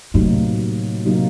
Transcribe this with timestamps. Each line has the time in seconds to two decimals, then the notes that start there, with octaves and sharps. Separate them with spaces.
0.14 A2 C3 F#3 A#3 D#4
1.06 C3 F#3 A#3 D#4